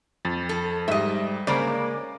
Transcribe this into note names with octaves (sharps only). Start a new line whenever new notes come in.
F2 A6
A4
G#2 G3 D#5 E5
C#3 G#3 A#3 C5 D5
D6